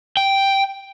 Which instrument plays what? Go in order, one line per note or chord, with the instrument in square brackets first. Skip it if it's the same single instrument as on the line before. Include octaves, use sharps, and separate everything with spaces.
[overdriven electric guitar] G5